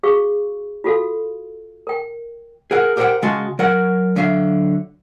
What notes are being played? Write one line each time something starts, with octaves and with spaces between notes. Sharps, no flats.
F#4 G#4 F5 C#6
F4 F#4 A4 F5
A#4 G5
G#4 A#4 F#5
G4 A#4 C5 E5 F#5 G5
C#3 G#3 F#4 F5 A5 C6
F#3 A#4 F#5
D3 F#3 E5 F5